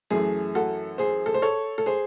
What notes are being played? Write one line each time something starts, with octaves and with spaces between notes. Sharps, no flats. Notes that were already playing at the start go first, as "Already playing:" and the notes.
F#2 E3 A3 G#4
F#4 A4
G#4 C5
A4
C5
A4 C#5
A4
G#4 C5